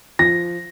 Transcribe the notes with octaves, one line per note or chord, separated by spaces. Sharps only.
F3 A#6